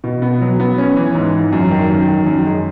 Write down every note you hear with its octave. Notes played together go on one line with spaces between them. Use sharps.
B2
B3
F#3
B3
C#4
E3
G#2
E3
F#2
D#3
F#2
D#3
F#2
G#3